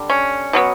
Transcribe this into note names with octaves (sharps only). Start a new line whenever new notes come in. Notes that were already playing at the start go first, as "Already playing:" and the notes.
Already playing: D3 G3
C#4
B2 F#3 B3